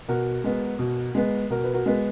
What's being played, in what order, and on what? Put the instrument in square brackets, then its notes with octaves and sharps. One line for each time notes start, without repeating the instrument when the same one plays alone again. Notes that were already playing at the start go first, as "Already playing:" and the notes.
[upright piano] B2 F#4 A#4
G#3 B3
B2
G#3 B3
B2 F#4 A#4
B4
F#4 A#4
G#3 B3